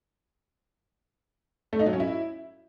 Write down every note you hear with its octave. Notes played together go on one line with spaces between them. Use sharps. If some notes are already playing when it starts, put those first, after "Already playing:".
A3
D#4
F#3
C#4
E4